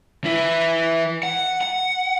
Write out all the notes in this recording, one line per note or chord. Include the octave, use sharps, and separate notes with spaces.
E3 E4
F#5
F#5